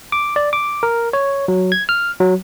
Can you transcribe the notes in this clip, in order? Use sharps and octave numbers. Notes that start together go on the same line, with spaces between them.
D6
D5
D6
A#4
C#5
F#3
G#6
F6
F#3